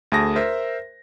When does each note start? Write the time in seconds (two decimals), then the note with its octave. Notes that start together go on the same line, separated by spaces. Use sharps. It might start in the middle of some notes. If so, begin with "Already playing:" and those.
0.12 D2 A3 G#4 A5 D#6 A#6
0.36 A#4 C5 E5